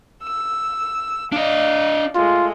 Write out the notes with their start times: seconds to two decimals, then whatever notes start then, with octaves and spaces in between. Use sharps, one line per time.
0.23 E6
1.32 D4 D5 D#5 F5
2.15 G#3 A3 F4